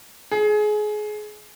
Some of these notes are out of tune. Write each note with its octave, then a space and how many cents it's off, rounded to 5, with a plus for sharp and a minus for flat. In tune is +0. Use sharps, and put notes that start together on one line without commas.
G#4 +25